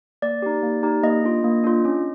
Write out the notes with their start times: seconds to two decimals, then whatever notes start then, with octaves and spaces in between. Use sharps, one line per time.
0.22 A#3 D5
0.42 D#4 G4
0.63 A#3
0.83 D#4 G4
1.03 A#3 D#5
1.24 D4 F4
1.44 A#3
1.64 D4 F4
1.85 C#4